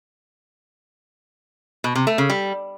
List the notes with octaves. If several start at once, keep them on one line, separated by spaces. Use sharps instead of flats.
B2
C3
A3
C#3
G3